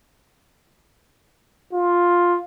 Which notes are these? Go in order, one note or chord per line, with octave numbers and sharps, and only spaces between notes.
F4